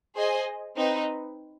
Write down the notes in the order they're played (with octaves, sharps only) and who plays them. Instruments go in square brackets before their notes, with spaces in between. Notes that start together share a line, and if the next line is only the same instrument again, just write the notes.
[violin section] G#4 C5 D#5 G#5
C4 D#4 B4